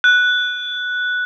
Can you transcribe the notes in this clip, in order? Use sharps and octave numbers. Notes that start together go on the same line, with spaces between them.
F#6